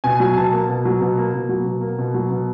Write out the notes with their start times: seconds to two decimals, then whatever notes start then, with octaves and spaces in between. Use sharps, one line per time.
0.04 B2 G#5
0.20 F#3
0.37 B2 A5
0.52 A#3
0.68 B2
0.85 F#3
1.01 B2
1.17 A#3
1.34 B2
1.49 F#3
1.65 B2
1.81 A#3
1.98 B2
2.14 F#3
2.31 B2